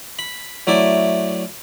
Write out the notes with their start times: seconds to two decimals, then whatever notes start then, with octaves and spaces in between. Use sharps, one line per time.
0.19 B5
0.67 F#3 A3 E4 D5